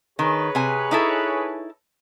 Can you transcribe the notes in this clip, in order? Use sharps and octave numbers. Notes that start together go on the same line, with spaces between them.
D#3 G#4 B4 C#5
C3 G#5
D#4 E4 A4